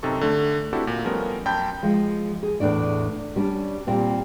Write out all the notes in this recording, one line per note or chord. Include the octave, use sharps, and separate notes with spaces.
F#2 C3 D#4 A4 C#6
D3 A3
C4 D4 E4 F#4 G4 A4
A#2
F3 G3 A3 B3 C#4 A#4
F#2 G5 A5 B5 G6
F3 G#3
G#4
E2 A2 D4 D5
G3 C#4 D4
A#2 G3 C4